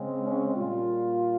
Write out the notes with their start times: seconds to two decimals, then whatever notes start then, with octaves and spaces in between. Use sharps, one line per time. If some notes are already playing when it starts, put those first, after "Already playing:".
Already playing: C#3 G#3 C4
0.24 C#4
0.56 A#2 G3 A#3 F4